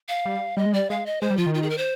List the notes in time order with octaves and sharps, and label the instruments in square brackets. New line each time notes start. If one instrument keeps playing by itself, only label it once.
[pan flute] F5
[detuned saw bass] G3
[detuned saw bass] G3 [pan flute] D#5
[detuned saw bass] G#3
[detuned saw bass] G3 [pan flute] D5
[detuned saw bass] G#3 [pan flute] F5
[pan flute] D#5
[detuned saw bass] G#3 [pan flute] C5
[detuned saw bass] G3
[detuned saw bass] F3 [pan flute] F4
[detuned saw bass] D#3
[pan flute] F4
G#4
A#4
C5